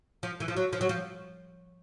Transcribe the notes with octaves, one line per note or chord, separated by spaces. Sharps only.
F3
E3
F3
F#3
F3
F#3
F3